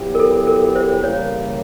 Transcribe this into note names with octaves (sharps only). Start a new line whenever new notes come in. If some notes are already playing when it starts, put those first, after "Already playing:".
Already playing: F#3 B3 E4 G4
A#4
A4
A#4
C5
C#3 E3 G3 A#3 C#5